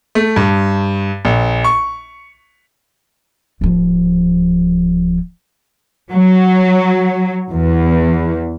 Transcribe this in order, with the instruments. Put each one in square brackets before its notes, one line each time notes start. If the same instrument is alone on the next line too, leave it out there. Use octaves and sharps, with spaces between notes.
[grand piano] A3
G2
A#1
C#6
[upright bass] D1 F3
[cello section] F#3
E2